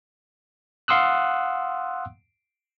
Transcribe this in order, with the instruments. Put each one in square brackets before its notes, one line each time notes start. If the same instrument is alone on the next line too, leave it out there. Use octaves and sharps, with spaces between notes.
[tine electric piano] F5 F#5 C6 D#6 E6 F#6